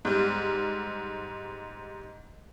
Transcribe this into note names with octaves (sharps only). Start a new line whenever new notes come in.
G#2 G3